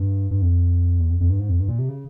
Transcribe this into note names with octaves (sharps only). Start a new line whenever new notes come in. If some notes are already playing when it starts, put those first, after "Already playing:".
Already playing: G2
G2
F2
E2
F2
F2
G2
G#2
F2
G2
A#2
C3
C#3